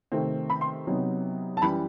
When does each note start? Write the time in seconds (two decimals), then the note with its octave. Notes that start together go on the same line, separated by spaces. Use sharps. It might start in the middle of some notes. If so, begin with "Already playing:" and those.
0.12 C3 D#3 A3 C4
0.50 B5
0.61 C6
0.87 C3 F#3 B3 D#4
1.57 A5
1.62 F#2 E3 G3 B5